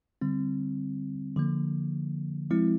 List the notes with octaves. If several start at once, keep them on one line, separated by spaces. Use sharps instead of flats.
D3 G3 C4
D3 F3 A#3
F3 G#3 C4 E4